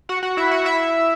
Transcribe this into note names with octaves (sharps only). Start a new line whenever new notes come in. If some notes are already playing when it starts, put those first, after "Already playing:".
F#4 F#5
F#4 F#5
E4 E5
F#4 F#5
E4 E5